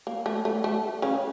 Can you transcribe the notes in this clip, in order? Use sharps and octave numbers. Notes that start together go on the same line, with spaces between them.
A#3
A3
A3
A3
C#3 C#4